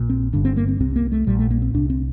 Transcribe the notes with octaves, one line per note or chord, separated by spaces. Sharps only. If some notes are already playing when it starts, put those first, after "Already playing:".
Already playing: A#1 A#2
C4
G1 G2 D3 D4
C4
A#3
C4
C2 C3 C4
A#3
A3
A#1 A#2 G3
A3
A#3
C4
C2 C3 D4
C4